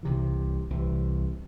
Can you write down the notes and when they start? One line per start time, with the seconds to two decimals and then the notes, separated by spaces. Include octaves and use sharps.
0.03 C2 C3 E3
0.70 C2 C3 E3